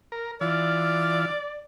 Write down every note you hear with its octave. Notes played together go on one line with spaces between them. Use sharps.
A#4
E3 F4 D5